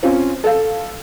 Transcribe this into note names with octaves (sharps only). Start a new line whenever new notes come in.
C4 C#4 F4
A4 F5